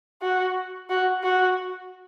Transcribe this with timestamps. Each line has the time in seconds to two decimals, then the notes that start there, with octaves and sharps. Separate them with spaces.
0.22 F#4
0.90 F#4
1.23 F#4